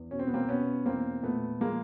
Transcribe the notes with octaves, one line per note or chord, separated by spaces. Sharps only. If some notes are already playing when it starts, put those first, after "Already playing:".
Already playing: E2
B2 C#4
C4
B3
A#3 C4
B2 B3 C#4
E2 A#3 C4
A#2 A3 B3
F3 G#3 A#3